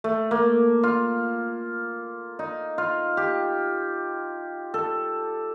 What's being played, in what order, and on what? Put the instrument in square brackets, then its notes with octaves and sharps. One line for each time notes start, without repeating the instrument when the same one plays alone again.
[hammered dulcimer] A3
A#3
F4
D#4
F4
G4
A4